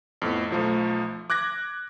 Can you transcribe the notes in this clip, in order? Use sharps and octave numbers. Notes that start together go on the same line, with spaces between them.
F2 A2 B3
B1 F3 A3
D6 F#6 G#6 A#6